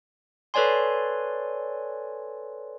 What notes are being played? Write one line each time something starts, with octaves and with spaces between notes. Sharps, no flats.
A4 B4 C#5 D5 G#5 C6